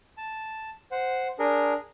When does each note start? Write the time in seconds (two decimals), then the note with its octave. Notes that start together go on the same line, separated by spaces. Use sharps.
0.17 A5
0.92 C5 F#5
1.39 D4 G#4 A#4